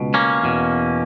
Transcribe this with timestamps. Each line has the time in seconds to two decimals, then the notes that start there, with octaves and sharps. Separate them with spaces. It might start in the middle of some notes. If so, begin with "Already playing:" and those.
Already playing: C#2 B2
0.14 A#3 C#4
0.42 E2 B2